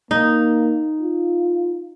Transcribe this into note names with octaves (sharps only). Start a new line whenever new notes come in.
A#3 D#4
F4